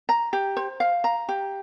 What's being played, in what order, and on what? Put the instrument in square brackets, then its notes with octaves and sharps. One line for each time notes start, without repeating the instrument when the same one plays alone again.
[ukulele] A#5
G4
C5
F5
A#5
G4